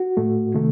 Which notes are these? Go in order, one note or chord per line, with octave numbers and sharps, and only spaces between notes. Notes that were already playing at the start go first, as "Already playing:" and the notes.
Already playing: F#4
A2 A3
C3 D#3 A3